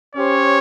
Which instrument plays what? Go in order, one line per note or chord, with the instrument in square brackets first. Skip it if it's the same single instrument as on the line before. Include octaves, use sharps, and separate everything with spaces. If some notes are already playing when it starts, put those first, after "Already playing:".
[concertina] C#4 G4 C5 [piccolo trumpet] C#5